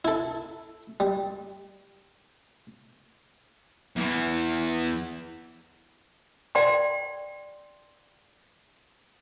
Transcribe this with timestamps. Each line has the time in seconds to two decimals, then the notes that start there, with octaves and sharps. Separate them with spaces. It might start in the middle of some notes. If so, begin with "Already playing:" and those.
0.05 E4 A4
1.00 G3
3.97 E2 E3
6.55 D5 G5 C6